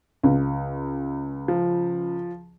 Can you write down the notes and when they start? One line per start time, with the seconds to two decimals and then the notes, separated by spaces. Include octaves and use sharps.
0.23 C#2
1.48 F3